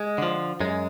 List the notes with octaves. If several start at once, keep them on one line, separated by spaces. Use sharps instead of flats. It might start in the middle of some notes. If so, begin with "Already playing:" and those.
Already playing: G#3
D3 F3
F#2 G#3